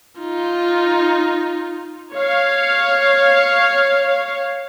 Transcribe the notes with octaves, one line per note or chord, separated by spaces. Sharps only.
D#4 F4
C#5 F5